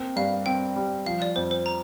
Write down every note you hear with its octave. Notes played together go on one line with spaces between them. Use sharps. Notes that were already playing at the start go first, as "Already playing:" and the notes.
Already playing: A#3 C4
G2 F5
C4 G5
G3
F3 F5
D5
F2 C5
C5
A#5